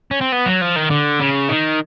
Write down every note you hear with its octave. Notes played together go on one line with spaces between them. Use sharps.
C#4
C4
B3
F#3
F3
D#3
D3
C#3
D#3